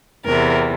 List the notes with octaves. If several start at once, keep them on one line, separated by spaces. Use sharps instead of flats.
E2 C3 E3 A#4